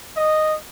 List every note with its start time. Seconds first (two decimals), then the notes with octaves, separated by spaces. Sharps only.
0.16 D#5